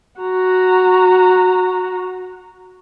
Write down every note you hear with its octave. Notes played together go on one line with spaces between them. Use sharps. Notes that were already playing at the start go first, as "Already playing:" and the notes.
F#4 A#5